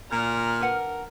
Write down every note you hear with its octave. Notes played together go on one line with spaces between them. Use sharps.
A#2 A#5 F6
D4 A#4 B4 F#5